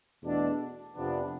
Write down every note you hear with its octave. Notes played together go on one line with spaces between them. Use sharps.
E2 B2 A3 D4 A4
F2 C3 F3 B3 D4